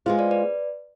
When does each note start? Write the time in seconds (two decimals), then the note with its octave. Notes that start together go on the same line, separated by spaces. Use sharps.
0.06 G#3 B3 F4 G#4 C5
0.19 B4 D5
0.31 B4 D5